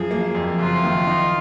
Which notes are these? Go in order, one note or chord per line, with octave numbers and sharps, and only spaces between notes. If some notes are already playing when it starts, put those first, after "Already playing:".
Already playing: F#2 F3 G#4
A#3
F2
F#1 F4
D#3
D#4